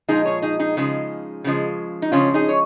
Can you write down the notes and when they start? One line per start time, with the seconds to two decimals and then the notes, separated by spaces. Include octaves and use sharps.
0.08 A#2 F3 G#3 D#4 G#4
0.25 G#4 C#5
0.42 D#4 G#4
0.60 D#4 G#4
0.77 C#3 F3 G#3
1.44 C#3 F3 G#3
2.02 D#4
2.12 C#3 F3 G#3 C#4 F4
2.34 D#4 G#4
2.48 C#5